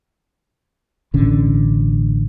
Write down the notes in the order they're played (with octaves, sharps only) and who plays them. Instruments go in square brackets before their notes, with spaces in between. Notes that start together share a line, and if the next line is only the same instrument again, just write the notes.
[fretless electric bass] A1 B2 D3 C#4